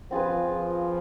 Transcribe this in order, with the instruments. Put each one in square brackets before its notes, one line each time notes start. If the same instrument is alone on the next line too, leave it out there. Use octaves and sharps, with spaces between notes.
[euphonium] F3 [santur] C4 F4 G#4 B4